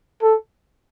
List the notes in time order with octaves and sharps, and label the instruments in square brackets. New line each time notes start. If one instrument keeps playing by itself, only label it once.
[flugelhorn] A4